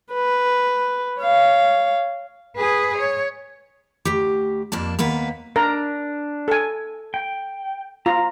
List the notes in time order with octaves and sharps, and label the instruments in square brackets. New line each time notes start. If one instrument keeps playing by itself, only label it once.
[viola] B4
C#5 F5
[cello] G#4 B4
C#5
[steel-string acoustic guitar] D2 G4
F2 A#3 D4 A5
D#2 A#3 B3 B4
[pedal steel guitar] D4 [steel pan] A#4 A#5
[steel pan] A4 G#5
[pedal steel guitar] G5
[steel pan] F4 [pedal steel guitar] A#5